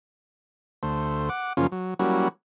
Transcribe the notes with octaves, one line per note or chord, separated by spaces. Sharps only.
D2 A3 C5
F#5 D6
F#2 C#3 F3 A#3 C#4 F4
F#3
F#3 G3 A#3 C#4 E4 F#4